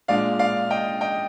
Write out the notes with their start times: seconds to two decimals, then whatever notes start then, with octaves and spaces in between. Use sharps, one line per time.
0.08 A#2 G#3 D4 D5 F5
0.39 D5 F5
0.71 D#5 G5
1.01 D#5 G5